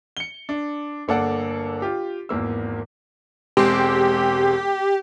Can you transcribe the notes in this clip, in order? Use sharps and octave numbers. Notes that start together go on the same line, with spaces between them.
C#7 G7
D4
G1 A#3 A4 D5 F#5
F4 G4
G#1 E2 A#3 E6
E1 G#3 C4 G4